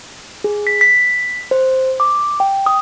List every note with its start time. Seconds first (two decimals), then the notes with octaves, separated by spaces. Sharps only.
0.44 G#4
0.67 B6
0.81 B6
1.51 C5
2.00 D6
2.40 G5
2.66 D#6